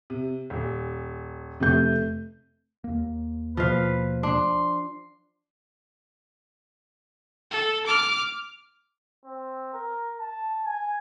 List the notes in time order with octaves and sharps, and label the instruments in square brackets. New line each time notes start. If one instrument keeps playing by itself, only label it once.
[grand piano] C3
D#1
[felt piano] F1 A3 G6 [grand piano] C3
[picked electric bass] D#2 A#3
[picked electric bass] D#2 B2 A#3 [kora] F3 F5 [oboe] B4
[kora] D4 [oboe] C6
[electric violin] A4
D6 F6
[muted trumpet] C4
A#4
A5
G#5